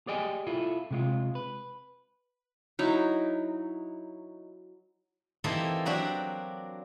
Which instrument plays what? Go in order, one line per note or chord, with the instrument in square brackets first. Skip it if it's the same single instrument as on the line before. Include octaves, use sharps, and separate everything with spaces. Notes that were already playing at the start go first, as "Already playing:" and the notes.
[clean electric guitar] G4 G#4 D5 D#5 G5 G#5
E4 F4 A4
C3 G#3 F4
B4
[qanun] F#3 D#4 E4
[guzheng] E3 A#3 C4 D#4 G4 A4
F#3 A#3 D4 F#4 G4